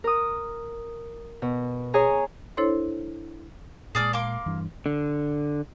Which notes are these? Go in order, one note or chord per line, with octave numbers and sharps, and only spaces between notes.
A#4 D#6
B2
G#4 C#5 G#5 A#5
D4 E4 A4 C5 C#5 C6
A#2 G#3 G#4 D5 F6
A#3 C6 D6
G2 E3
D3